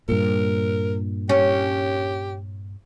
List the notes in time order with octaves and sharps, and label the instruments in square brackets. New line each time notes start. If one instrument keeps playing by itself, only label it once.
[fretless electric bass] G2 A#2 [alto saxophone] A#4
[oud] C#4 [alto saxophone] G4